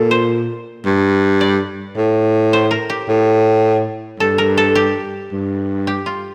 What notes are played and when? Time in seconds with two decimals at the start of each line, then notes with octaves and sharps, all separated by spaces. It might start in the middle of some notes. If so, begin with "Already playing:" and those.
Already playing: A#2 A4
0.11 C5
0.85 G2
1.41 D5
1.97 A2
2.53 C5
2.71 A#4
2.90 G4
3.08 A2
4.20 G2 A4
4.38 A#4
4.57 A4
4.75 G4
5.32 G2
5.87 G4
6.06 F4